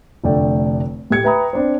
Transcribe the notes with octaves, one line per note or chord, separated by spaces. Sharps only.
F1 D3 A3 D4 D5 G5
A2 G4 G#6 C#7
B4 E5 G5 A#5 B5 D#6
C4 D4 C5